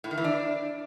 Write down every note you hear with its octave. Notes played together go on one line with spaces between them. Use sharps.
A2
D#3
E3
D4